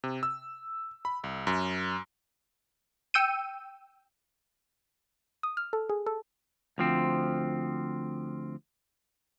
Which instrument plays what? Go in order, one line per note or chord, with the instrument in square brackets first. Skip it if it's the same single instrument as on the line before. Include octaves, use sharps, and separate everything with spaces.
[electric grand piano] C3
E6
B5
C2
F#2
[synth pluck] G5 E6 G6 C#7 D#7
D#6
F6
A4
G#4
A4
[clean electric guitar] D2 F3 C4